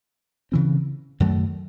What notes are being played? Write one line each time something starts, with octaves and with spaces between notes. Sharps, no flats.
C#3 E3 C4
F#2 D#3 F#3 A3